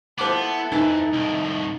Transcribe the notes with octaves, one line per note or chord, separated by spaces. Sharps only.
F3 B3 E4 A4 D6
F2 E3 D#4
C2 A2 A3 D#5